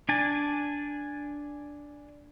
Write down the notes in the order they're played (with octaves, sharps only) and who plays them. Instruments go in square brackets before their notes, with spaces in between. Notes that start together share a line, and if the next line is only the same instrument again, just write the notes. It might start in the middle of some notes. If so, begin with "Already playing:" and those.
[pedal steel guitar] D4 D5 G#5 A5